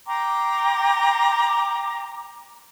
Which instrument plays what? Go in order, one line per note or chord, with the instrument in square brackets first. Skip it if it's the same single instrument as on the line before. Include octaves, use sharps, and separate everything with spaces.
[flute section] G5 A#5 C6 D6